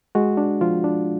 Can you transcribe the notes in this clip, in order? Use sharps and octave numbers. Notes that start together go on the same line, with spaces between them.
G#3 F#4
D4
F3 F4
D4